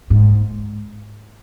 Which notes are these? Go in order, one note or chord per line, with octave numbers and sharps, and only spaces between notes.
G#2